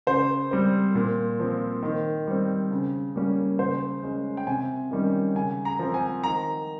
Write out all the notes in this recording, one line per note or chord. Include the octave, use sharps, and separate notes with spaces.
C#3 C5
G3 C4
A#2
F3 C4
D#3
G3 C4
C#3
G3 A#3 C#4
C#3 C5
G#3 C#4
G5
C3 G#5
D#3 G3 C#4
C#3 G#5
A#5
F3 C4
G#5
D#3 A#5